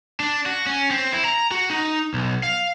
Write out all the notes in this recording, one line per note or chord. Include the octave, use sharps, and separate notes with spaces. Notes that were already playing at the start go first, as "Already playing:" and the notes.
D4
F#4
C#4
C4
E4
A#5
F#4
D#4
B1
F5